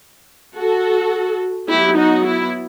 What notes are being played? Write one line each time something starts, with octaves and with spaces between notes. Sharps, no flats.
F#4 A4
F#3 B3 E4 G4
D#4 F#4
E4